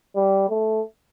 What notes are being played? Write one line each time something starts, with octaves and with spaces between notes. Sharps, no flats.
G3
A3